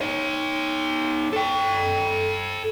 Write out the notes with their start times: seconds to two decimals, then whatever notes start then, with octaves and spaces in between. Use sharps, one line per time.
0.01 D#4 C#5
1.33 A4 G5